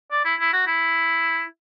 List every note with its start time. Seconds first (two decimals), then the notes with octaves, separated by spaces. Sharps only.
0.12 D5
0.25 E4
0.40 E4
0.53 F#4
0.67 E4